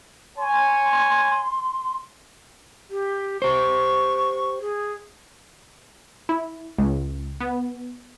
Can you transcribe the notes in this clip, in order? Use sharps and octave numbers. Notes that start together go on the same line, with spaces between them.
C#5 G#5 C6
G4
G4 C5 C#6
G#4
E4
C#2
B3